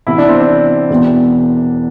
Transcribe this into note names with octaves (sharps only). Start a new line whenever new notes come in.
C2 C3 E3 E4
D4
C4
D4
E1 E2 E3